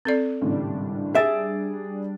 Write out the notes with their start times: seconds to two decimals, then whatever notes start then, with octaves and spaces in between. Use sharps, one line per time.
0.05 C4 A4 D5
0.42 G#1 A2 C#3 G3 D4
1.15 G#4 E5 A6 D7